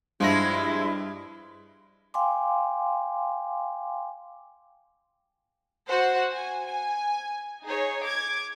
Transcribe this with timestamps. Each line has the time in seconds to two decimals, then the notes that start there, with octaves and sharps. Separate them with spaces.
0.20 G2 F3 G#3 E4 F4 A#6
2.14 F5 G5 G#5 C6 D6
5.88 F#4 C5 F#5
6.31 G#5
6.65 G#5
7.64 D#4 G#4 C#5
8.04 D6 G#6